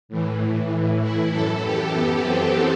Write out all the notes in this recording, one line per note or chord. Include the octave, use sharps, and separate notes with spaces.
A2 E3
E4
F#2 E3 A4
G4
B3
C4